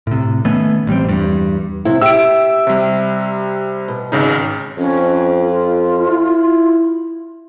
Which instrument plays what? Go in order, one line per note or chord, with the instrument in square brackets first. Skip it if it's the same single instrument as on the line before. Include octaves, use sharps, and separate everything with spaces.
[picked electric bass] A2 C3
D#3 A3 B3 C#4
A1 G3 C4
E2 G2 G3
[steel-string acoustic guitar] C3 E4
[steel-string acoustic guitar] G4 E5 [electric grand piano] E6 D7
[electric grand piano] C3 G3
[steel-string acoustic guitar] B2
[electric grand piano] G#1 C#3 D#4
[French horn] F2 [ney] C#4
[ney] F4
[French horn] E4